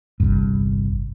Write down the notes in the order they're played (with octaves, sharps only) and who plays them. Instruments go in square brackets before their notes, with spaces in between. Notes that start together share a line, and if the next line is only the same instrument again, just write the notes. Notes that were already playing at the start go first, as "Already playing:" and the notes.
[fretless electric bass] G1 C2 G2